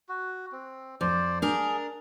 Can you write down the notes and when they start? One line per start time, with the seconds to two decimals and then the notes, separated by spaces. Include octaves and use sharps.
0.09 F#4
0.52 C4
1.01 F2 C5 D5
1.42 D4 G#4 A#4